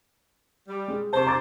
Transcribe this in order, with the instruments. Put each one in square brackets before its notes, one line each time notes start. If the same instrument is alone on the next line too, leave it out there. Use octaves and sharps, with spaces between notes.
[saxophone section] G3
[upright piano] G#3
[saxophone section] C3 C5 [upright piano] A5 C#6
[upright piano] A#5 D6 A6